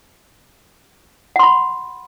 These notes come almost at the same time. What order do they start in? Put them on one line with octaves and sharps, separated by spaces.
F#5 C6 B5